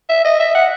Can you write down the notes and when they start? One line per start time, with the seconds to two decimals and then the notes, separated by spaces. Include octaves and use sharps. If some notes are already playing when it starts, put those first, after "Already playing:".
0.09 E5
0.24 D#5
0.40 E5
0.55 F#5